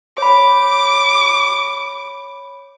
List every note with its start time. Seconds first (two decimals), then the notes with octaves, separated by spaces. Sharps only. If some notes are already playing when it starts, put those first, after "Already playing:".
0.18 C#5 B5 D6